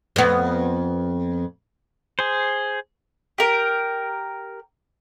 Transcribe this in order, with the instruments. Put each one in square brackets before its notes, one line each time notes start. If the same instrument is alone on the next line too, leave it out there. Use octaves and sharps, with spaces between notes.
[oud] F2 B3
[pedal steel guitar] G#4 C5
[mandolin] G4 A#4